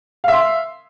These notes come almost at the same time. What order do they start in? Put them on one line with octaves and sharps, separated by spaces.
F5 E5 C6